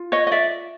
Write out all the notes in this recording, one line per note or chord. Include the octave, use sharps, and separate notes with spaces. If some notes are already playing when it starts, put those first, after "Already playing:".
Already playing: F4
C#5 D#5
D#5
D5 E5